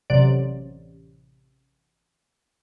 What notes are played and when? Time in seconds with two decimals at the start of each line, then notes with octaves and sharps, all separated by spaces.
0.10 A1 C3 F#3 D5